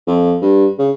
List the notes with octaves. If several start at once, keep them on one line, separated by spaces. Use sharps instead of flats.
F2
G2
C#3